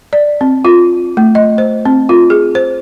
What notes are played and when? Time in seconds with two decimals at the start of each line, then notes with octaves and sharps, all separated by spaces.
0.13 D5
0.41 C4
0.65 F4
1.17 A3
1.35 D#5
1.58 C5
1.85 C4
2.09 F4
2.30 G#4
2.55 C5